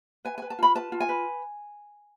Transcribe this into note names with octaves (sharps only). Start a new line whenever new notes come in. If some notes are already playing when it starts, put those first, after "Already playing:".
B4 G#5
B4 G#5
A5
F4 B5
B4 A5
F4
G#5
B4